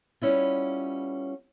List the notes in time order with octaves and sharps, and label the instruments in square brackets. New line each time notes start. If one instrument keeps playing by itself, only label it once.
[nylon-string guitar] G3 B3 C#4 E4 F4